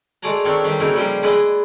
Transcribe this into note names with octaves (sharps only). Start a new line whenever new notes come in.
G#3 A3 G#4 D5 A5 A#5
D#3 C4 D4 F4 C#5
D#3 G3
C#3 A#3 C4 D#4 E4 F#4
C#3 F3 G3 D#4 G#4 C6
G#3 E4 G#4 B4 D5 D#5